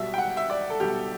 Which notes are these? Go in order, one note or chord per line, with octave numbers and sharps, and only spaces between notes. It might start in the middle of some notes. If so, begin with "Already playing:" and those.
Already playing: B1 B2 G3 E5
G5
F#5
E5
D5
A4
B1 B2 G3 G4